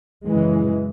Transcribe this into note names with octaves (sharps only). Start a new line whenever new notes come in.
F#2 C#3 E3 G#3